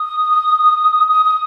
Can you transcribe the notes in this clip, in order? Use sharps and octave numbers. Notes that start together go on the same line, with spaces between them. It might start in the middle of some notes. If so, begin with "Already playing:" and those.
Already playing: D#6
D#6
D#6